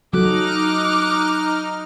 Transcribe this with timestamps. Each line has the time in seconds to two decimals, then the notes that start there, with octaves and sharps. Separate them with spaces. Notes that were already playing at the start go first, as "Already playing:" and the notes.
0.13 F#3 D#4 F#4 A4 D6 F6 F#6